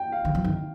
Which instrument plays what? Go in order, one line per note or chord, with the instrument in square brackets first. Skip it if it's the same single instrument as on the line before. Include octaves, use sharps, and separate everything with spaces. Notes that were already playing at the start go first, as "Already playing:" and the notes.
Already playing: [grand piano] G5
F5
[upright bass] D#3
F3
D#3